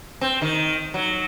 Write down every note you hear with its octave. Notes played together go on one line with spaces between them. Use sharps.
C4
D#3
F#3